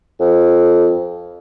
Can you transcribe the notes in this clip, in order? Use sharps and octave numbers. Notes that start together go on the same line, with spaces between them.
F2